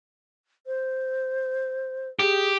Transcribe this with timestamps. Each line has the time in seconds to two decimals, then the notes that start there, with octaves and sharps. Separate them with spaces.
0.67 C5
2.19 G4 G#4